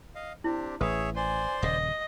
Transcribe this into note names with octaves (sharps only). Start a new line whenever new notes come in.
D#5 F5
C4 D4 E4 G4
A1 G#4 B4 C#5 E5 D#6
C5 D5 G#5 C6
D#1 C#3 D#5